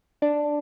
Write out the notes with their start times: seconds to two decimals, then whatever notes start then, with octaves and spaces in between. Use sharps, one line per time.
0.22 D4